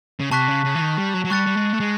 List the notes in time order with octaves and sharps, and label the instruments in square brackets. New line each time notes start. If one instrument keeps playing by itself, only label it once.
[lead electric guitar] C#3
[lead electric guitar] C3 [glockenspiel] A5 C#6 F#6 B6
[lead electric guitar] C#3
C#3
E3
D#3
G3
F#3
F#3
[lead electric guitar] G3 [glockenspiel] C#6 F#6 A6 C#7
[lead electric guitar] G3
G#3
A3
G#3